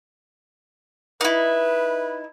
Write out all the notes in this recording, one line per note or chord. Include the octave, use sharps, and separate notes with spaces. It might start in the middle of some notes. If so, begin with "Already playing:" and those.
D#4 E4 B4